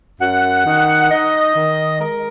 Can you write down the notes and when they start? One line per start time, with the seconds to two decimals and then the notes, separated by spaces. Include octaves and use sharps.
0.20 F#2 F#5
0.65 D#3
1.10 D#4 D#5
1.55 D#3
2.00 G#3 A#4